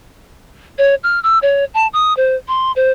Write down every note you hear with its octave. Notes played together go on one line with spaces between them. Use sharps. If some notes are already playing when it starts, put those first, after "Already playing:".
C#5
F6
E6
C#5
A5
D#6
C5
C6
C5